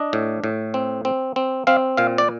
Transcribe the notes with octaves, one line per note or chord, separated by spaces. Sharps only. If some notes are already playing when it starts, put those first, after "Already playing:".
Already playing: D4 D#5
A2
A2
C4
C4
C4
C4 F5
A#2 F5
D5